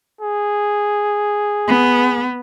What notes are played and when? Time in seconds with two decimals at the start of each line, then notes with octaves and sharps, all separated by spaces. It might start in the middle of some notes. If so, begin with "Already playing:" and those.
0.21 G#4
1.68 B3